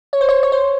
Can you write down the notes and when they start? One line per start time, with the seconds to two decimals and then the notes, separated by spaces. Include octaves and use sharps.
0.13 C#5
0.21 C5
0.29 C#5
0.43 C#5
0.52 C5